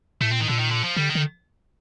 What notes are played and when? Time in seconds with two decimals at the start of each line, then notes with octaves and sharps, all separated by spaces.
0.21 A2 A3
0.30 A#2 C4
0.40 A2 D#3
0.49 A#2 D3
0.59 D#3
0.71 D3
0.84 F3
0.96 D3 G3
1.10 D#3
1.15 D3